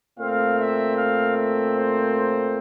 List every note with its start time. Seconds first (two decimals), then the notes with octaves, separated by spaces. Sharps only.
0.18 A#2 A3 C4 F5
0.59 E5
0.97 F5
1.37 E5
1.76 C5